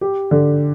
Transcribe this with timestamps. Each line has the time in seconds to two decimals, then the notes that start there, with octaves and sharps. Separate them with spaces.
0.01 G4
0.31 D3